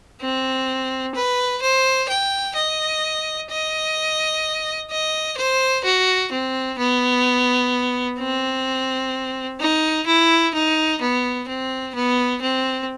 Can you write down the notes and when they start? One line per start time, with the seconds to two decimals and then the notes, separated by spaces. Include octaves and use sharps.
0.21 C4
1.15 B4
1.62 C5
2.09 G5
2.56 D#5
3.51 D#5
4.91 D#5
5.38 C5
5.85 F#4
6.32 C4
6.79 B3
8.19 C4
9.60 D#4
10.07 E4
10.54 D#4
11.02 B3
11.48 C4
11.95 B3
12.42 C4